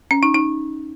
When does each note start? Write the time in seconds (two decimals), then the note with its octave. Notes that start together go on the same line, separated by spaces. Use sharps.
0.11 C#4
0.23 D#4
0.34 D#4